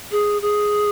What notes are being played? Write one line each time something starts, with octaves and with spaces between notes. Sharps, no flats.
G#4
G#4